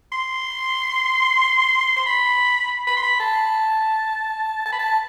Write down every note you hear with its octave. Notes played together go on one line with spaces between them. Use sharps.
C6
C6
B5
B5
C6
B5
A5
A5
B5
A5